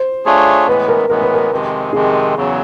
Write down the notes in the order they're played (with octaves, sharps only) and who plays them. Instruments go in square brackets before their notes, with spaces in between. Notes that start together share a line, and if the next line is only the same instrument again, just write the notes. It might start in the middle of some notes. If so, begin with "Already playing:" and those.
Already playing: [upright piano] C5
[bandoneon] A3 D4 F4 G#4 C#5
[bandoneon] A2 E3 G#3 B3 [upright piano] B4
[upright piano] A#4
[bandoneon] A2 E3 G#3 B3 [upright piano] A#4
[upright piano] B4
A#4
[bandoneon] F2 C3 D#3 G#3
[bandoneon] F2 C3 D#3 G#3 [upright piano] G#4
[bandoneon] E2 C#3 F#3